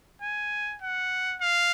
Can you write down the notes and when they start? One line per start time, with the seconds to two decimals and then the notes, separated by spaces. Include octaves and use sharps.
0.22 G#5
0.82 F#5
1.42 F5